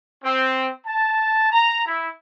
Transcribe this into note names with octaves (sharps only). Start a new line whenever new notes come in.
C4
A5
A#5
E4